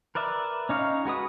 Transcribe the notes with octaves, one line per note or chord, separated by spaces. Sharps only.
A#4 B4 D5 E5
C#4 D#4 C#5 F5
G#3 F#4 B4 D#6